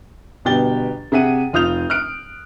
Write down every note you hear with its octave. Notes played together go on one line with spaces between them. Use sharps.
G1 B2 G4 A6 G7
C3 G#4 E5 F#5 D#7
F1 F4 D#6 G6 F7
F6 F#6 D7